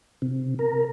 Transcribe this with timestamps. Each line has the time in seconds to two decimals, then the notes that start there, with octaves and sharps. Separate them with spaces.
0.22 C3
0.59 A#4